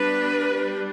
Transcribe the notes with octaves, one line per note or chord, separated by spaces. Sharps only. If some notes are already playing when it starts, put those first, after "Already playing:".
Already playing: G3 B3 D4 B4
G3 D4